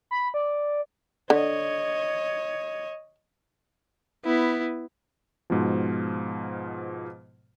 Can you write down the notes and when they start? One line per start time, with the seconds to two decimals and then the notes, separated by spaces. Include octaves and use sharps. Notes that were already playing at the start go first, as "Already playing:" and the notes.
0.11 B5
0.34 D5
1.30 D3 C#5 D#5
4.25 B3 E4
5.50 G#2 B2 F3